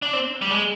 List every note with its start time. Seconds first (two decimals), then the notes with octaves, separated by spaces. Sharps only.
0.02 D4
0.13 C4
0.42 G3
0.51 G#3